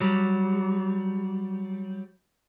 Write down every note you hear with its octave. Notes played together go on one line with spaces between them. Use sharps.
F#3 G3